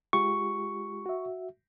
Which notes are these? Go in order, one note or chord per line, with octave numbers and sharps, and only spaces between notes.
G#3 F4 G4 C#6
F#4 E5